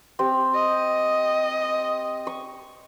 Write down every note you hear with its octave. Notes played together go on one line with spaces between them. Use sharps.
C4 G4
D#5
C#6